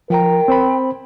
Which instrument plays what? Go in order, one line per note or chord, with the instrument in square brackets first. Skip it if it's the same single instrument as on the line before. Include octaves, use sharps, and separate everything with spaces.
[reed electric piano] F3 A#5 [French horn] A#4 [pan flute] G5
[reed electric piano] C4 C5 B5